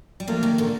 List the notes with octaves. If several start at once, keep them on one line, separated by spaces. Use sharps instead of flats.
G3
F3 A3 A#3
D#3 G3
A#2 D3